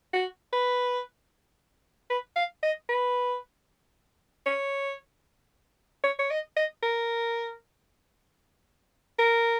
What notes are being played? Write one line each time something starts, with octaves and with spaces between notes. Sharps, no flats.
F#4
B4
B4
F5
D#5
B4
C#5
C#5
C#5
D#5
D#5
A#4
A#4